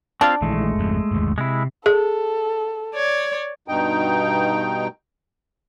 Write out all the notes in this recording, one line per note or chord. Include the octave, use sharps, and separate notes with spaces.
C4 D4 F4 F5
A#1 D#3 E3 G#3 A3
G#1 F2
G1 D#2
C3 G#3 E4
G#4 A4
C#5 D5
G2 B2 D#4 G5